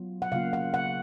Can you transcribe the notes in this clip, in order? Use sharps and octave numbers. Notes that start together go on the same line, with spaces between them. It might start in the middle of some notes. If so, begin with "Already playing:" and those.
Already playing: F#3 B3 F4
F#5
C#3 F#3 A#3 F4 F5
F#5
F#5